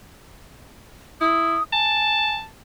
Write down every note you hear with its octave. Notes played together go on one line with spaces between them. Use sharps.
E4 D#6
G#5 A5